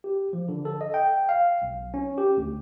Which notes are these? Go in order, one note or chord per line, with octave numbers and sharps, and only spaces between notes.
G4
F3
D3
A4
D#5
G5
F5
B1
C#4
G4
D2